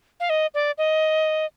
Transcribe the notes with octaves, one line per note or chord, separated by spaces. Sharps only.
F5
D#5
D5
D#5